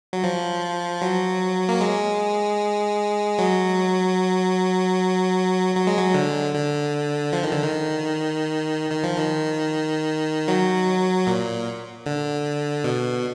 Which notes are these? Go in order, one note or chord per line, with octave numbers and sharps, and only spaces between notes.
F#3
F3
F#3
A#3
G#3
F#3
F#3
G#3
F#3
D3
D3
F3
D#3
D3
D#3
D#3
F3
D#3
F#3
A#2
D3
B2